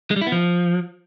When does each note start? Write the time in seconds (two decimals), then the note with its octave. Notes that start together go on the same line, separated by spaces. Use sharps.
0.11 G#3
0.16 G3
0.21 E4
0.27 B3
0.32 F3